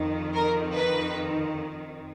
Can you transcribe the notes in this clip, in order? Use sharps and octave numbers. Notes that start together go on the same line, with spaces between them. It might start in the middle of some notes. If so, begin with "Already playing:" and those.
Already playing: F2 D#3
A#4
B4